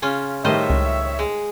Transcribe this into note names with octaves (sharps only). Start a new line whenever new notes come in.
C#3 C#4 F4
A2 D#3 G3 F4 C5 C#5 D#5 E5
C#2
G#3